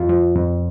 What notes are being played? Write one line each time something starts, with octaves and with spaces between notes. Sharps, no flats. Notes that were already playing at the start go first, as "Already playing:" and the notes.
Already playing: F2 F4
F3
F2